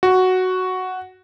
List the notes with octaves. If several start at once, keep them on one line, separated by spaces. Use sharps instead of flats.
F#4